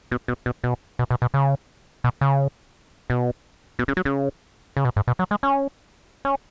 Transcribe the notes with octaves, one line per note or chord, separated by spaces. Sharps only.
B2
B2
B2
B2
B2
B2
B2
C#3
B2
C#3
B2
B2
C#3
F#3
C#3
C#3
B2
G#2
B2
F#3
G#3
C#4
C#4